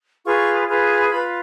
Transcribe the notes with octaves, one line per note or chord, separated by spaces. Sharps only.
F4 G#4 B4 C#6
F4 G#4 B4
F4 B4 B5